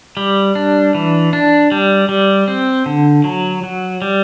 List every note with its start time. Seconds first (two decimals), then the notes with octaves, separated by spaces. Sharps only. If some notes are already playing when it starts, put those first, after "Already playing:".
0.17 G3
0.55 D4
0.95 E3
1.33 D4
1.72 G3
2.09 G3
2.48 C4
2.86 D3
3.24 F#3
3.63 F#3
4.02 G3